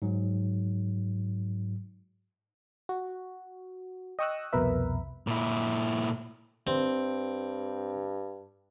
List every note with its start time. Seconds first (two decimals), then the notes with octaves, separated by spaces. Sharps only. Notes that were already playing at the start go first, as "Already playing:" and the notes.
0.02 G#2 F#3
2.89 F#4
4.19 D#5 G5 C#6 D#6 E6 F#6
4.53 C2 F2 B2 A#4 B4 E5
5.27 A#2 E4
6.67 G2 C4